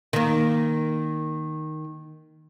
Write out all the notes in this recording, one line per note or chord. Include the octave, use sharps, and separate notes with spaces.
D#3 A#3